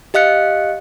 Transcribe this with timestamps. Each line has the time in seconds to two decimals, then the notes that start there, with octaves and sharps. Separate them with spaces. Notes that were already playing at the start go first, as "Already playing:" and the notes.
0.14 G4 D#5 F5 F#6 C#7